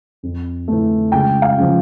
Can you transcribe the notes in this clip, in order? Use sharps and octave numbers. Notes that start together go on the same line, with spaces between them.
F2
E3 A3
C#2 G5
F5
C#3 F3